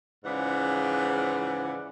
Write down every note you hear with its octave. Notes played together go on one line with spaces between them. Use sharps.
G#2 C#3 E3 F3 D5 F#5